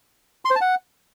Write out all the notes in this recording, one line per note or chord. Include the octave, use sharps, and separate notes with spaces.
C6
C5
A5
F#5